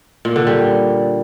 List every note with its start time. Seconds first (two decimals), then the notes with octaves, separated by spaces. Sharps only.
0.25 A#2
0.36 D3
0.47 G3